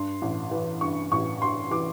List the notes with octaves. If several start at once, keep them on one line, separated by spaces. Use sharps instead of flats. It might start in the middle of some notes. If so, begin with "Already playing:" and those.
Already playing: G2 C6
A1
E3
G2 C#6
A1 C#6
G2 C6
E3 D6